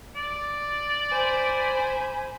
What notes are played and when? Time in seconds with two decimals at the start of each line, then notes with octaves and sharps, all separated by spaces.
0.16 D5
1.11 C5 G#5 B5